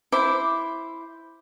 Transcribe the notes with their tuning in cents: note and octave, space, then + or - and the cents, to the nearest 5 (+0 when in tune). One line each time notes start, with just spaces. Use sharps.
E4 +0 C5 +0 D6 +0